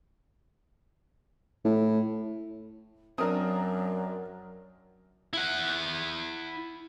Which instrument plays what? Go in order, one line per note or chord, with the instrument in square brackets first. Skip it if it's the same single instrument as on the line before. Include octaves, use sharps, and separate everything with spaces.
[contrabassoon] A2
[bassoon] F#2 [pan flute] F#3 [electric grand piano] C4 D4 [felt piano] A#4 D#6
[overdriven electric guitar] E4 F#5